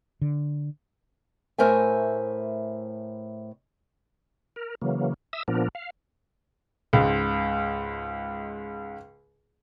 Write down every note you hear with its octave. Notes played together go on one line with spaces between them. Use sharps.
D3
A2 A3 A#4 C5 E5 G#5
A#4
C#3 E3 F#3 A#3
E5 D#6 E6
A#2 F3 B3 D4 A#4
F5
C#2 G#2